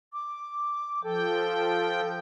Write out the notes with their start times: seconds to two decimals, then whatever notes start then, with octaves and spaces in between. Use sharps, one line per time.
0.13 D6
1.04 F3 A4 G5